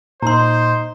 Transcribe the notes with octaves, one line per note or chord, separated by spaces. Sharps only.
A#2 D#4 C5 A#5 C6